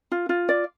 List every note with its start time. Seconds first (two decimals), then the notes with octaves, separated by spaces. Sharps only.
0.12 F4
0.29 F4
0.49 D5